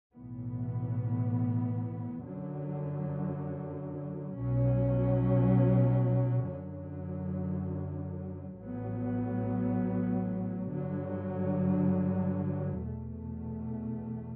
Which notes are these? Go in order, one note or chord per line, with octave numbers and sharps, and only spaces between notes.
B1 A2 E3 B3
F#2 D3 F#3
B1 B2 F#3 C#4
F#2 D3 F#3
A1 A2 F#3 B3
G2 D3 F#3
E2 B2 A3